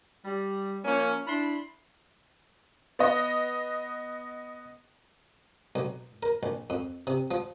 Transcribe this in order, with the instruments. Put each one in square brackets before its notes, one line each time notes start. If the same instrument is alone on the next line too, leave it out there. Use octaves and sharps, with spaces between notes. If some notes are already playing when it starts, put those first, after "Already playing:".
[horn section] G3
F3 A#3 C#4
D4 E4 B5 C6
[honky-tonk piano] B3 D#5
[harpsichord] B1
A#4
A#1
F2
C3
F3